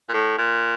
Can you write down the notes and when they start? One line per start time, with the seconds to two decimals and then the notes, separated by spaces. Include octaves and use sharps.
0.09 A#2
0.14 A2
0.38 A#2